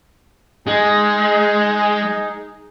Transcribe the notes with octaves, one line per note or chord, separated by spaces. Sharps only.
G#3 D#4 G#4